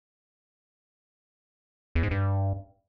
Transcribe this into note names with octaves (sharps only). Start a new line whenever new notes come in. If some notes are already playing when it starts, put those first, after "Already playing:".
E2
G#2
G2